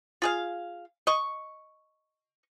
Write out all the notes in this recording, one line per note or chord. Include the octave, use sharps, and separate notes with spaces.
F4 G#4 F5
D#5 C#6